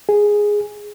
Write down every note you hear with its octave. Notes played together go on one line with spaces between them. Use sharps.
G#4